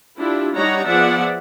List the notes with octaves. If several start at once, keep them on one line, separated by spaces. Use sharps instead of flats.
D4 E4 F4 G4
G3 D4 D#4 C#5 F#5 A#5
F3 B3 G#4 D5 E5 F#5